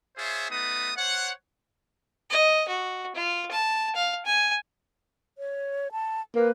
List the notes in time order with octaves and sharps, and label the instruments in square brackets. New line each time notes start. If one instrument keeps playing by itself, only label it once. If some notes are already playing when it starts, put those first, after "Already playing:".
[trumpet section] F4 G#4 C5 C#5 E5
A3 B3 D#4 B4 D#6
C5 C#5 F#5
[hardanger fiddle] D#5
F#4
F4
A5
F5
G#5
[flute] C#5
A5
[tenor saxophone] A#3 [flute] B4